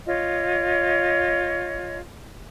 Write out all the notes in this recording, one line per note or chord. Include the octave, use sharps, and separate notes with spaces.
F4 C#5 D#5